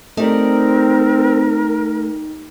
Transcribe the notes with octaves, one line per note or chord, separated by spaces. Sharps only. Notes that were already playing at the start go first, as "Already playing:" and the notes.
A3 C4 D#4 G4 A#4 D5